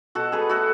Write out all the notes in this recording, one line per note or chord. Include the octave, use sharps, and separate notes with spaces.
B2 F#4 A4
G#4 B4
A3 F#4 A4